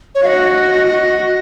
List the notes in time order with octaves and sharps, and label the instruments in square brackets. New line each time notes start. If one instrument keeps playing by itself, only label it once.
[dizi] C#5
[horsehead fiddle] F#4 [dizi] D#5 F5
[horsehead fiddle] F#4